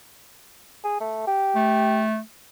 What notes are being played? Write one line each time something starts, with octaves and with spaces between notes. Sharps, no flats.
G#4
A3
G4
A3